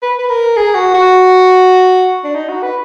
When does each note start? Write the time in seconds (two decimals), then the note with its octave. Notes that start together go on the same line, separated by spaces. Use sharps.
0.02 B4
0.19 B4
0.30 A#4
0.57 G#4
0.75 F#4
0.94 F#4
2.24 D4
2.36 D#4
2.49 F#4
2.63 B4